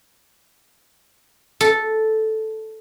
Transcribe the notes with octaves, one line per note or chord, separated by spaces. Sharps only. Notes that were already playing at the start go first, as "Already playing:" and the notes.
A4